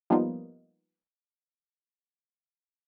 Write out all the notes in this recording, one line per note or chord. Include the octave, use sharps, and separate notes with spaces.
F3 G3 A#3 B3 D#4 F4